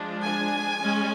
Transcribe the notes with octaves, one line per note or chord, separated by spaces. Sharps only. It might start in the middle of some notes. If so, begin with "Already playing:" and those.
Already playing: F3 G#3 D4
G#5
G#3 C#4